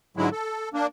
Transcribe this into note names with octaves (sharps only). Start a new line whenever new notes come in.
G#2 D3 F#3 G#3 E4
A4
A#3 D4